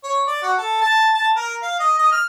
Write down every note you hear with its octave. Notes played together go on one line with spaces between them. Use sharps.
C#5
D5
F#4
A4
A5
A5
A#4
F5
D#5
D#5
F6